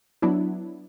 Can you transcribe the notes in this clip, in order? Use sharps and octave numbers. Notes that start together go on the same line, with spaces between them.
F#3 B3 D4 E4